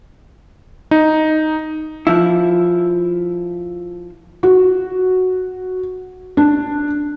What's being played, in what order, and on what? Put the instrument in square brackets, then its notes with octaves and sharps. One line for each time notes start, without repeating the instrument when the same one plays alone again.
[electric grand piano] D#4
[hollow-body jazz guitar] F3 E4
[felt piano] F#4
D4